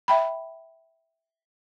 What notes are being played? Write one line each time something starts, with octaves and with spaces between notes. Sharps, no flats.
E5 G5 B5